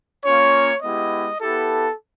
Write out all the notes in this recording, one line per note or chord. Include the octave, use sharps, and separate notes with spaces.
A#3 C#4 F4 C#5
G#3 B3 E4 G4 D#5
B3 E4 G4 A4